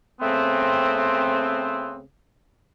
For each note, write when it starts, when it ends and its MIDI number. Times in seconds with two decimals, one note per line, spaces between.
0.21 2.00 49
0.21 2.00 57
0.21 2.00 59
0.21 2.00 60